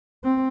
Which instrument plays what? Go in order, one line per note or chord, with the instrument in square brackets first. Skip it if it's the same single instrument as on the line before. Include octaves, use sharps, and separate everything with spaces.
[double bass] C4